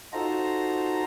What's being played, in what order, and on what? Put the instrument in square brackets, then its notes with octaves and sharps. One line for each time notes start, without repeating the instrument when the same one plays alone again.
[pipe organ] D#4 F4 F#4 A4 C5 A#5